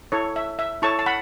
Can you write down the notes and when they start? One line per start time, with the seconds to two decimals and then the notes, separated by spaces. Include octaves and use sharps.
0.12 E4 A4 C#5
0.36 E5
0.59 E5
0.82 E4 A4 C#5 A5 C#6
0.99 A5
1.06 F#5 B5